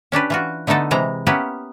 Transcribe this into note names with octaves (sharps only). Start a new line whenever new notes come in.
C#4 D4 G4 B4
E3 F4 F#4
D3 A3 B3 D#4 A4
C3 E3 G#3 A#5
A#3 B3 C#4 E4 G4 B4